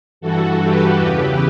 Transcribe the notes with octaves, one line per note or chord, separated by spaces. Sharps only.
G2 E3 F#4 A4
G4 B4
E2 C#3 E3